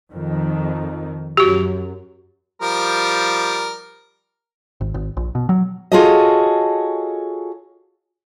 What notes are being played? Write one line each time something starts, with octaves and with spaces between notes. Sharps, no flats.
F2 D#3
F#2 F#4 G4
F3 G3 A#4
G#1
G#1
A#1
B2
F#3
F4 F#4 G#4 A4 C#5 D#5